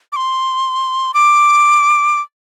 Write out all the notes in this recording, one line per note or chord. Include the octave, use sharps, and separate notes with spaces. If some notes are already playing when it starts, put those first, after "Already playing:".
D6
C6
D6